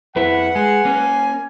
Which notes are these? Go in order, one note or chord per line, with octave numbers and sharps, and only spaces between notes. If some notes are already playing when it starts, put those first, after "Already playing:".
F2 E4 B4 F#5
G#3 G#5
A#3 C#4